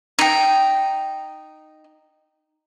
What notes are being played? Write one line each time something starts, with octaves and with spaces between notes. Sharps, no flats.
D#4 G5